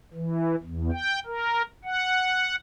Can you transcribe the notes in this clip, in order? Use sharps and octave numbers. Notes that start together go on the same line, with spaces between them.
E3
E2
G5
A#4
F#5